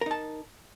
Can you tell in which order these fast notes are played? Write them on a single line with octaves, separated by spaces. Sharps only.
A#4 D#4 A5